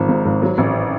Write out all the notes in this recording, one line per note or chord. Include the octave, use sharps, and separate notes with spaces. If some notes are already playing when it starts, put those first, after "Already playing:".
Already playing: G#1 F3
G#2
G#1
F#3
A1